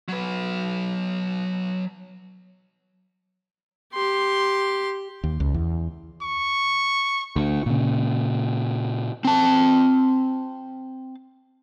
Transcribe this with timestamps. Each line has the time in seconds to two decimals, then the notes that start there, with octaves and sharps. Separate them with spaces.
0.09 F#3 B4
3.94 G4 C6
5.24 D#2
5.40 C#2
5.54 E2
6.22 C#6
7.36 D2
7.66 A#2 C#3
9.25 C4 A5